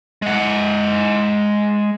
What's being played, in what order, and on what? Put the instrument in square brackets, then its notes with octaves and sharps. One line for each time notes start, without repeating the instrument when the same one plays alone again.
[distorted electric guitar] G#3 F#5